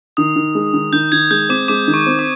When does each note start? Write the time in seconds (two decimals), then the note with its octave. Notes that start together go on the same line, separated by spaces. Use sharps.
0.17 D#3 D#6
0.36 D#3
0.55 G#3
0.73 D#3
0.93 D#3 G6
1.12 D#3 G#6
1.31 G#3 G6
1.49 C4 D6
1.68 G#3 D6
1.88 D#3
1.94 C#6
2.07 C4
2.19 D6